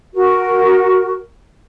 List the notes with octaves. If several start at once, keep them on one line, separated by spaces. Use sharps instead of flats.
F#4 A#4